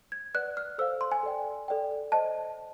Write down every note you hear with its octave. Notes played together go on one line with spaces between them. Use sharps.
G#6
B4 D5 F#5 F#6
F6
A4 C5 F5 E6
C6
G#5
A4 D5 G5
A4 D5 G5
C5 D#5 G5 A5